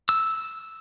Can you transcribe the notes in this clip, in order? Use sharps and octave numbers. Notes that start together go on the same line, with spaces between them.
E6